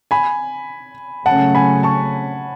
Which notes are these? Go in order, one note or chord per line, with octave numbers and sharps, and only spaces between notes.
G#5 B5
C#3 F#3 A3 C#4 F#5 A5
G#5 B5
A5 C#6